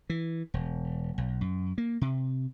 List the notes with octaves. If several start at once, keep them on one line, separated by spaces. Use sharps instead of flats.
E3
E1
B1
F#2
A#3
C3